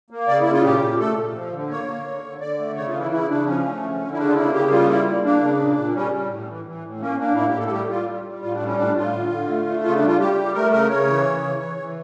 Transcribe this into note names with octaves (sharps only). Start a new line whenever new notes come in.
A#3
C#3 D5
E4
C#3
F4
A#2 G4
A#2
A3 A4
A#2
F3
D3
A#3 C#5
A#3
D3
D3
D3 D5
A3
C#3 C#5
F4
E3
E4
C#3 E4
C#3 D4
F3 C#4
A3
D3
D3
E4
C#3 D4
F4
A#3 E4
C#3 G4
G3 F4
A#3 E4
A#3
A#3 D4
C#3
A#2
A#2
G3 C#4
G3
A2
E3
E3
A2
A#3 C#4
A#3 D4
A2 E4
G4
A2 A4
A4
G3 G4
G3 F4
G3
G3
A2 F4
D4
G3
C#4
A2 D4
A2 F4
D3
D3
A3
A3
C#3 F4
D4
G3 F4
G3 G4
G3
A3 A#4
C#3 A#4
C#3 C#5
E3
C#3
E3
E3
E3